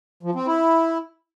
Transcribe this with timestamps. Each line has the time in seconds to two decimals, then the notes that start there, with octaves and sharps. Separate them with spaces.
0.23 F3
0.35 C4
0.47 E4